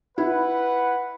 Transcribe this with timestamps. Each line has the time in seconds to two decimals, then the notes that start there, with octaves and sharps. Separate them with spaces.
0.18 E4 B4 F#5